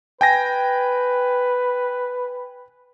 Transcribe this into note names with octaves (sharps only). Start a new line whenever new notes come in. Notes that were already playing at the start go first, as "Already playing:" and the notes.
B4 G5 G#5 A#6